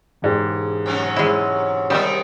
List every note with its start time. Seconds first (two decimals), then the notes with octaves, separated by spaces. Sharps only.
0.22 E1 G#2 G4
0.86 C3 F#3 C#4
1.16 G#3 E4
1.90 C3 D#3 G3 G#3 E5 D#6